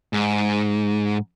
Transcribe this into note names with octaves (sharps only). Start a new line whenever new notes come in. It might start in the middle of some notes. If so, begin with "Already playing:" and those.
G#2